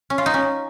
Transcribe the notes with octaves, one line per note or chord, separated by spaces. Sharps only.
C#4
F4
D#4
C#4